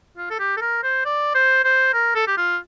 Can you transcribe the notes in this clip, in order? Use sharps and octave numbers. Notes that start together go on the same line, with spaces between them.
F4
A4
G4
A4
A#4
C5
D5
C5
C5
A#4
A4
G4
F4